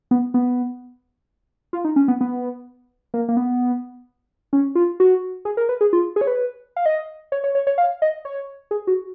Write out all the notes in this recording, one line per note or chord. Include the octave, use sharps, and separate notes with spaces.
B3
B3
F4
D#4
C#4
B3
B3
A#3
A#3
B3
C#4
F4
F#4
G#4
A#4
B4
G#4
F4
G#4
C#5
B4
F5
D#5
C#5
C#5
C#5
C#5
F5
D#5
C#5
G#4
F#4